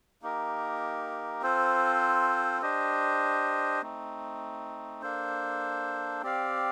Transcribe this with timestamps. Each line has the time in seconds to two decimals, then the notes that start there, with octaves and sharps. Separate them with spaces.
0.22 A#3 D#4 G4 A#4
1.42 C4 F4 A4 C5
2.62 D4 G4 C5 D#5
3.82 A3 C4 D#4
5.02 A#3 D4 A4 C5
6.22 C4 G4 D5 F5